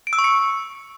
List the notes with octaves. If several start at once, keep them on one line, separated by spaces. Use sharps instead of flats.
D7
E6
C#6
C#7